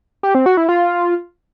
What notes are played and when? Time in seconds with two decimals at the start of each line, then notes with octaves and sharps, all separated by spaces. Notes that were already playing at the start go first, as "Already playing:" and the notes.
0.23 G4
0.35 C4
0.46 F#4
0.57 E4
0.69 F4